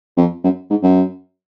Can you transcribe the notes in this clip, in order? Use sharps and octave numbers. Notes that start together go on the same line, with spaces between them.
F2
F#2
G#2
F#2